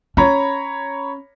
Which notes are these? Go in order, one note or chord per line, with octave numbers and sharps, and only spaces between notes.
C#4 C#5 A#5 B5